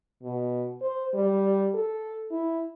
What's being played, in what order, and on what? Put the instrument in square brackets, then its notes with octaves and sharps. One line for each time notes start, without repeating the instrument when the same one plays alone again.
[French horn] B2
C5
G3
A4
E4